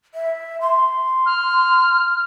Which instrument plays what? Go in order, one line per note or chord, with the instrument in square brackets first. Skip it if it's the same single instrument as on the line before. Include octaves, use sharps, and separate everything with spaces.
[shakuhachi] E5
C6
[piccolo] F6